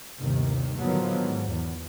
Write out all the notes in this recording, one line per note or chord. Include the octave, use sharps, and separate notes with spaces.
G1 D#2 C3 D#3
A2 D3 D#3 F3 F#3 B3
G#2
E2